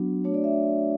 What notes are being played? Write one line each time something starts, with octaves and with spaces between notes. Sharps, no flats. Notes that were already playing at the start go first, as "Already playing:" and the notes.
Already playing: F#3 B3 D4 F#4
A3 D4 F#4 C#5
D5
E5